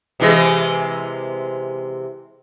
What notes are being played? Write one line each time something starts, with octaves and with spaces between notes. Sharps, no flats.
C3 E3 G#3